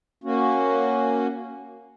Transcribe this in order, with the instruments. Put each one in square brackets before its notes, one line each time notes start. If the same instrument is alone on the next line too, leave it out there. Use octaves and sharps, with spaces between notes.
[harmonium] A#3 C#4 F#4